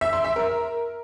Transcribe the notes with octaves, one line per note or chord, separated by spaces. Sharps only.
E5
C6
E5
A#4